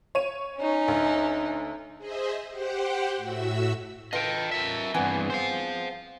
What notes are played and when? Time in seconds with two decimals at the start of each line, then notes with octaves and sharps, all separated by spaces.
0.15 C#5 D#7
0.57 C#4 D#4
0.88 D2
1.97 G#4 C5 D#5 E5
2.49 G4 C5 F#5 G5
3.17 A2 F#4 E5 E6
4.13 F4 A4 B4 D#5 G5
4.52 A#4 E5
4.94 G2 E3 B3 C4 G#4
5.30 C5 F5